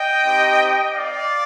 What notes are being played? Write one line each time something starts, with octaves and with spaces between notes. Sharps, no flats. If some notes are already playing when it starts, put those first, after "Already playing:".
Already playing: D#5 G5
C4 D#4 G4
D5 F5